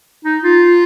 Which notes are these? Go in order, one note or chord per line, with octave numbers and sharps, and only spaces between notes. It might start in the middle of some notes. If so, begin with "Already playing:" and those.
D#4
F4